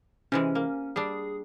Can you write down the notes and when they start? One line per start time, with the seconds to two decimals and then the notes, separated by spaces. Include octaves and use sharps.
0.32 C3 E3 G#3 C#4
0.55 A#3
0.96 G3 D4 G#4